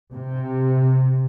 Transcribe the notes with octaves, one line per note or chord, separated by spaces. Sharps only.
C3